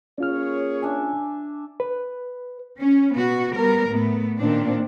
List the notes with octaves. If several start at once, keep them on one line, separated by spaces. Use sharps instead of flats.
A#3 C#4 F4 G#4 C#5 F6
D4 E5 G#5
B4
C#4
B2 B3 F#4
G3 B3 A#4
A2 A3 B3
A#2 D#3 C4 D4